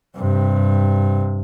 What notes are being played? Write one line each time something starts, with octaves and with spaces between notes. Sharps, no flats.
G2 C3